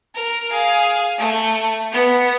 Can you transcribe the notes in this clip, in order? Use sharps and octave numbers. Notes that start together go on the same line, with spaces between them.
A#4
G#4 F5
A3
B3